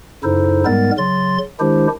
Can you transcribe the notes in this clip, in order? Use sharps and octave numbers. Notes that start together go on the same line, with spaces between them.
F#2 C#3 D#4 E4 A4 C5
G#2 G3 G#3 B3 A#4 A6
C#3 F#3 C6 A6
D#3 G#3 D4 E4 G4 C5